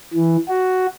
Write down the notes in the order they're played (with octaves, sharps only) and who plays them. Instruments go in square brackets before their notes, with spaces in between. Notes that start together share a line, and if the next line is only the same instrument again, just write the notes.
[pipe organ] E3
F#4